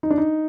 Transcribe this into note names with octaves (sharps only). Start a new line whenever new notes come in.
D#4
D4
D#4